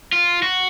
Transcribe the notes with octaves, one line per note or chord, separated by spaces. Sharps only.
F4
F#4